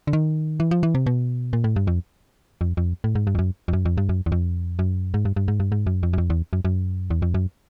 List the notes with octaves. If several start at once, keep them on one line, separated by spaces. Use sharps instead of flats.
D3
D#3
E3
F3
E3
C3
B2
A#2
A2
G2
F2
F2
F2
A2
G#2
G2
F2
F#2
F2
F#2
F2
G2
F#2
E2
F2
F#2
G#2
G2
G2
G#2
G2
G#2
F#2
F2
F#2
F2
E2
F#2
F#2
E2
F2
F#2